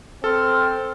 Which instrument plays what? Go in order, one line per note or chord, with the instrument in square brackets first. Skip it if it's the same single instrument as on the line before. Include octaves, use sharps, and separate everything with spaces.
[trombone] C4 [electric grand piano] A4 [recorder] F6